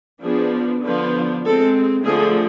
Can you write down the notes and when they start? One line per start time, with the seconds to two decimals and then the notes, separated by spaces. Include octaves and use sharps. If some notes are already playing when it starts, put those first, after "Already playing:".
0.24 F3 B3 D4 G#4
0.84 D3 F3 B3 D4 B4
1.45 G#3 C4 A4
2.05 D3 F3 A3 G#4